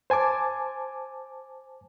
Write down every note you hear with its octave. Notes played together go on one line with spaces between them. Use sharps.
C5 G#5 A5 D6